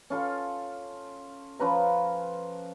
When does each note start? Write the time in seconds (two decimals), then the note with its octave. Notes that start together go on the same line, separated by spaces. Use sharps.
0.10 C#4 F4 A4
1.59 F3 C#4 B4 A#5